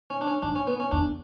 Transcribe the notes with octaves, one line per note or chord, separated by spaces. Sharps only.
C#4
D4
C#4
F#2 D4
C#4
B3
C#4
E2 D4